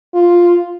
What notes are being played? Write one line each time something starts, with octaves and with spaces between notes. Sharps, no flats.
F4